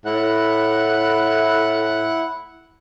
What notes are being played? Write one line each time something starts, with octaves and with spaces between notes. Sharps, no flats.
A2 E4 F#5 F#6